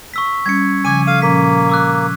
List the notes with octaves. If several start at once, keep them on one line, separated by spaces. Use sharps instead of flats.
C#6 E6 B6
G3 C#4 G#6 C#7
C#3 F3 G#5 D6 D#7
A4 F5 D#7
A#2 F3 A#3 C#4 B6
D6 E6 F#6